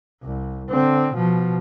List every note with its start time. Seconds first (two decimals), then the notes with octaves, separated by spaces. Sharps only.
0.23 C2
0.71 D3 C4
1.14 B2 F3